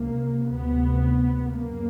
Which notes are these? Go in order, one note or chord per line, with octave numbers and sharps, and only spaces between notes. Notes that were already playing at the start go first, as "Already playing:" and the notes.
Already playing: C#2 C3 A#3
D2 C3 B3
F#2 C#3 A#3